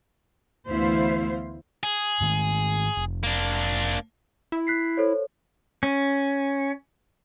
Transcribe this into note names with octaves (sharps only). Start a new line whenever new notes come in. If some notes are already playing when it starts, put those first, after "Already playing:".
D2 E3 B3 E4 C5 F5
G#4
G#2 D#3 A3
F1
A#3 D4
E4
F#6 B6 C7
A4 C5 C#5
C#4